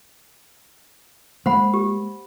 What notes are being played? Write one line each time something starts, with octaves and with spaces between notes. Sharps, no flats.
G#3 A#3 C5 F#5 B5
G4